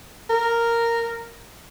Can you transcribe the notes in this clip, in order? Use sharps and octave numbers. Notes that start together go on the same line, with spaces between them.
A#4